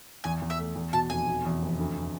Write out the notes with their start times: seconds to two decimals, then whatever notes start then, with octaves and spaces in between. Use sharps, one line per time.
0.24 E2 G#5
0.42 E2
0.50 E5
0.59 A3
0.75 E2
0.93 B2 A5
1.10 F1 G#5
1.28 B2
1.45 E2
1.62 F1
1.80 D2